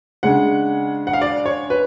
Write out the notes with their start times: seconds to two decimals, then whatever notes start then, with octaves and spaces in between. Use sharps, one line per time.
0.23 C#3 G#3 D4 F#5
1.07 F#5
1.13 F5
1.21 D5
1.46 C#5
1.70 B4